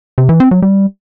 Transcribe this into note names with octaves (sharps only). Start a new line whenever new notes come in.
C3
E3
C4
F#3
G3